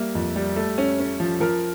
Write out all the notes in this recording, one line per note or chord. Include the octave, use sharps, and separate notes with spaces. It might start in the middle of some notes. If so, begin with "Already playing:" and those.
Already playing: G3 A#3 E5
F2
G3
A3
C#4
C#4
F3
F3 A#4